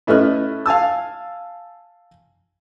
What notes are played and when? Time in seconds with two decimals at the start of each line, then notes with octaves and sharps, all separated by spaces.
0.07 A2 A3 C#4 B4 D#5 F6
0.66 F5 G#5 A5 E6